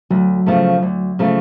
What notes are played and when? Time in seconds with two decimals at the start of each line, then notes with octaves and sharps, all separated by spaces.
0.11 D2 F#3
0.46 C#3 F3 A3
0.82 D2
1.19 C#3 F3 A3